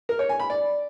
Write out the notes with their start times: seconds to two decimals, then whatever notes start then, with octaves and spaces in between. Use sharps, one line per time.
0.09 A#4
0.19 C#5
0.29 G#5
0.40 B5
0.50 D5